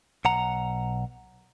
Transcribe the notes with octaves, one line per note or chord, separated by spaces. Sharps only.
B1 F#5 A#5